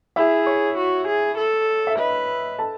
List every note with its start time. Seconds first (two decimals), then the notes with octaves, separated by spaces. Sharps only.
0.16 E4 G#4 E5
0.47 C#5
0.77 F#4
1.07 G#4
1.38 A4
1.87 E5
1.98 B4 D#5
2.59 A4 A5